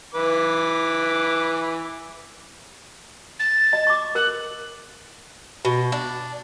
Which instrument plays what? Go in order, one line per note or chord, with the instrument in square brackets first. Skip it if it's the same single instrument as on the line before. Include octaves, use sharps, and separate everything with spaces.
[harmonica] E3 B4 D6
[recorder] A6
[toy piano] D#5
C#6 D6
[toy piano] A#4 [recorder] F#6
[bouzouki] B2
D4